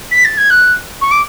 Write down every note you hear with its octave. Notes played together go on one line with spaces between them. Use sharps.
B6
A6
G#6
F#6
C#6
D6